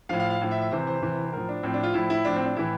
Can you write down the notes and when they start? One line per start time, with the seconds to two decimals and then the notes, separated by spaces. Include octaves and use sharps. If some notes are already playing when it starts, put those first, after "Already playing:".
0.09 A2 F3 F5
0.20 F5
0.30 F5
0.41 A2 F3
0.51 E5
0.61 E5
0.71 C3 E3 C5
0.87 C5
1.02 C3 E3
1.24 C5
1.32 A2 F3 A#4
1.49 D4
1.63 A2 F3 C4
1.74 D4
1.83 F4
1.94 A2 F3 E4
2.10 E4
2.25 A2 F3 D4
2.36 C4
2.46 D4
2.56 A2 E3 E4